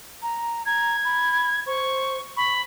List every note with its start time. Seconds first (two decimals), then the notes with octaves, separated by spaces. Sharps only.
0.23 A#5
0.66 A#5 G#6
1.05 B5
1.67 C5 C#6
2.37 B5 C#6